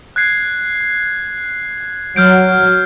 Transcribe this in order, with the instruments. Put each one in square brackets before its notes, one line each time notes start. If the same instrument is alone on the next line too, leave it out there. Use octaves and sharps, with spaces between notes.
[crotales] F#6 G#6 C7
[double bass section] F#3 [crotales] F6 G6 D7